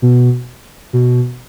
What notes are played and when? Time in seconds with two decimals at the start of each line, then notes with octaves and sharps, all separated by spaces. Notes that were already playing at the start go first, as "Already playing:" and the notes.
0.02 B2
0.93 B2